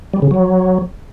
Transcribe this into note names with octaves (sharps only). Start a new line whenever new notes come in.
G3
C#3
F#3